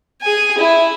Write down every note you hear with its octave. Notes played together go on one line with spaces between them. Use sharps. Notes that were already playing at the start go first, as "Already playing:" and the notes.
G#4 G#5
E4